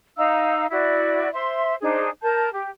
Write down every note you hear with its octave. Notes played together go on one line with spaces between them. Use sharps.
D#4 F5 A#5 E6
E4 F#4 D5
C5 E5 C6
D4 D#4 G#4 C5
A#4 A5 G6
G4